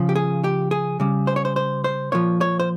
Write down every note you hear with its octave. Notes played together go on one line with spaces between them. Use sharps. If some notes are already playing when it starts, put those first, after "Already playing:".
Already playing: C#3 F3
G4
G#4
G4
G#4
C#3 G3
C5
C#5
C5
C5
C5
A#2 F3 C#5
C#5
C5